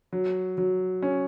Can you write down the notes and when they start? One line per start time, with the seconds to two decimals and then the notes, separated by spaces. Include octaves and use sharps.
0.13 F#3
0.58 F#3
1.02 C#4